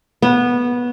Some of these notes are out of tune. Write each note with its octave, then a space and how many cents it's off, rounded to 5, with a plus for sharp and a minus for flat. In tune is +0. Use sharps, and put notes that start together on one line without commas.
B3 -15 C#5 +0